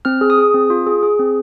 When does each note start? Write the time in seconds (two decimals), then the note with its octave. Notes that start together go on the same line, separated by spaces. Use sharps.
0.05 C4 F6
0.21 G#4
0.30 D#6
0.38 G#4
0.54 C4
0.70 F4
0.87 G#4
1.03 G#4
1.19 C4